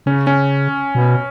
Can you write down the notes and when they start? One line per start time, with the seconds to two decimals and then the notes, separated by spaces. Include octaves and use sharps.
0.06 C#3 C#4
0.27 C#4
0.95 B2